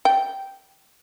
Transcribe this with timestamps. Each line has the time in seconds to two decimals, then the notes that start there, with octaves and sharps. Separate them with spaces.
0.05 G5